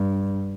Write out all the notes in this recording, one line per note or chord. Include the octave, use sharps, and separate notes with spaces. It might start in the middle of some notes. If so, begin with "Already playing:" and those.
Already playing: G2